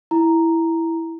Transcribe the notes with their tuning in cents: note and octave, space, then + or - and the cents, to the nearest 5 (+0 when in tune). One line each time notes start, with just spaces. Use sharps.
E4 +0 A#5 +0